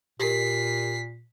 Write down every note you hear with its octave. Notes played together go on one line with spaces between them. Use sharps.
A#2 G4 A#4 B6 C7